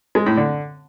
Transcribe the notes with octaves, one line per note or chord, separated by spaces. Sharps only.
G#3
A2
D3